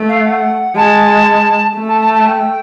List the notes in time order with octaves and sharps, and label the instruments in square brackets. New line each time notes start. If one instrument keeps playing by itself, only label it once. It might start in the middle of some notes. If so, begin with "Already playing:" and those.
Already playing: [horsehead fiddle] A3
[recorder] F5
F#5
[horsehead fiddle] G#3 [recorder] A5
[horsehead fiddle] A3
[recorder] A5
A5
A5
G5